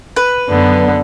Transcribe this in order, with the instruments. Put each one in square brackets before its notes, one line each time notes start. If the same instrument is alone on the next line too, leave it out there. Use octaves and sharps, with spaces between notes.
[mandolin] B4
[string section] F#2 B3 [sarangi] D3